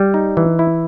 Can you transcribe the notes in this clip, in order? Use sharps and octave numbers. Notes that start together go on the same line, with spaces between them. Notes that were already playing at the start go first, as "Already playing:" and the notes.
Already playing: G3
D#4
E3
E4